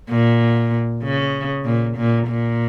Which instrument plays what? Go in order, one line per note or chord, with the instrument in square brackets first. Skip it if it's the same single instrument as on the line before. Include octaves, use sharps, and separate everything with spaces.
[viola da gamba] A#2
C#3
A#2
A#2
A#2